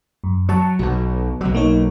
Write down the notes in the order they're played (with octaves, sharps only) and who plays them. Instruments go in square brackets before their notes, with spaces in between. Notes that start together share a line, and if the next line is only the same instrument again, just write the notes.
[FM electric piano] F#2
[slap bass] F#3 [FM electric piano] A5 C#6
[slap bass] B1 B2 [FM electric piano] F#4
[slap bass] B1 F#3
[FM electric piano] A#3 D#4 C#5